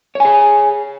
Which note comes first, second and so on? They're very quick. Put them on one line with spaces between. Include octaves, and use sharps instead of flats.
C#5 G#5 G#4